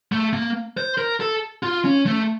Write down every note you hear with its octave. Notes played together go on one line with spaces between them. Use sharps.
A3
A#3
C5
A#4
A4
F4
C#4
A3